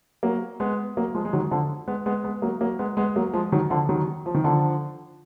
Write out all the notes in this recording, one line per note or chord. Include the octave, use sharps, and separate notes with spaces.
F#3 A#3
G#3 B3
F#3 A#3
F3 G#3
G#3
D#3 F#3
D3 F3
G#3 B3
G#3 B3
G#3 B3
F#3 A#3
F#3 A#3
G#3 B3
G#3 B3
F#3 A#3
F3 G#3
D#3 F#3
D3 F3
D#3 F#3
F3
D#3
D3 F3